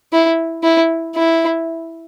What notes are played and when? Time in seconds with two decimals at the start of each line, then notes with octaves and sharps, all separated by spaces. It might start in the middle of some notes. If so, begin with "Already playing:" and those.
0.12 E4
0.63 E4
1.15 E4